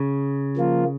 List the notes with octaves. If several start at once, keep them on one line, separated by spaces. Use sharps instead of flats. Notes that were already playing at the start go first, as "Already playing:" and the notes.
Already playing: C#3
F3 A#3 F4